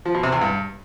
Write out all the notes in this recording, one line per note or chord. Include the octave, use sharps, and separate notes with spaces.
F3
B2
C3
E2
G2